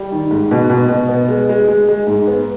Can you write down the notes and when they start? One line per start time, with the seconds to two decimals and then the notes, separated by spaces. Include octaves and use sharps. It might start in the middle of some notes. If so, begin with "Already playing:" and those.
Already playing: G3
0.12 D#3
0.31 G#2
0.51 B2
0.70 B2
0.89 B2
1.09 B3
1.28 G#3
1.49 G#3
1.68 G#3
1.88 G#3
2.07 G#2
2.28 B3